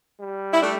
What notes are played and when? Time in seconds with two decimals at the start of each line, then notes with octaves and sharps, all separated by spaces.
0.20 G3
0.52 E4
0.61 A3 D4